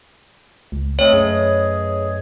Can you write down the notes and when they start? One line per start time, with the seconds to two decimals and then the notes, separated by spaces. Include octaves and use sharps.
0.72 C#2
0.99 A3 C4 B4 C#5 D#5
1.13 F#2 G#4